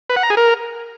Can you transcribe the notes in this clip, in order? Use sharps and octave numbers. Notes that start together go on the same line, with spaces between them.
B4
F#5
A#5
G#4
A#4